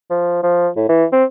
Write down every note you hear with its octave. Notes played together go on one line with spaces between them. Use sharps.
F3
F3
A2
E3
C4